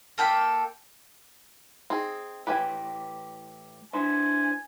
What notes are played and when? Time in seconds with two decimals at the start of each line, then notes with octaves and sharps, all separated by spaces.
0.18 A#3 A4 G5 B5
1.90 C4 D#4 G#4
2.47 A2 E3 G4 B4 G5 G#5
3.93 D4 E4 B4 C5 G#5